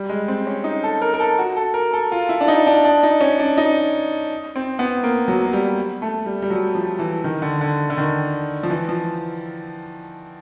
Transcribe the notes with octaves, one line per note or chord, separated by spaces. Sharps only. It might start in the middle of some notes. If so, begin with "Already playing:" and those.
Already playing: G3
G#3
C4
C#4
D#4
A4
A#4
A#4
A4
F#4
A4
A#4
A4
F4
E4
D4
D#4
D4
D4
D#4
C#4
D4
D#4
C4
B3
A#3
F#3
F#3
G3
A3
G3
G3
F#3
F3
E3
D#3
D3
D3
D3
D#3
F3
E3
F3